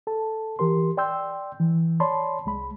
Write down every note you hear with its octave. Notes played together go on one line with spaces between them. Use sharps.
A4 A5
E3 G4 A#4 C6
D5 G5 C6 E6 G6
E3
C#5 D5 A5 B5 C6
C2 G#3 B5